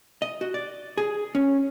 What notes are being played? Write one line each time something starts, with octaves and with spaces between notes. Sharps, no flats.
D#5
F#4
D5
G#4
C#4